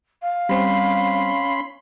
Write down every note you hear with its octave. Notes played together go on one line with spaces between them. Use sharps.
F5
G3 C4 C#4 B5 C6